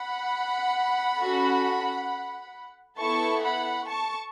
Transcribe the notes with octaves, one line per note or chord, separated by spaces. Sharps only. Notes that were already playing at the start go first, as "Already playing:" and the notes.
Already playing: F#5 B5
C#4 F#4 A4
B3 E4 A4 A5 C#6
F#5 B5
A5 C#6